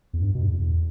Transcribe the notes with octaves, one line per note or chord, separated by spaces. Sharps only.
E2
G2
B2
G2
E2
E2